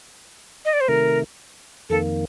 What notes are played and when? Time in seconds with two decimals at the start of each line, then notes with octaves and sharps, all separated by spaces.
0.65 D#5
0.73 D5
0.81 C5
0.88 C3 D#3 A3 A#4
1.89 F2 D#3 A#3 A4